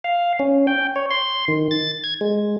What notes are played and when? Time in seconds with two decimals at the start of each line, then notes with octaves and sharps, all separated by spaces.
0.04 F5
0.39 C#4
0.67 G5
0.96 C#5
1.11 C6
1.48 D#3
1.71 A6
2.04 G#6
2.21 G#3